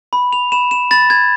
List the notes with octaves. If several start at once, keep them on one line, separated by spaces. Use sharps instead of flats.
B5
F7
B5 E7
E7
B5 A6
G#6